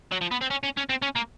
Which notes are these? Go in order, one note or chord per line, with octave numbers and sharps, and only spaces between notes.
F#3
F3
B3
C4
C#4
C#4
C#4
C4
C#4
A#3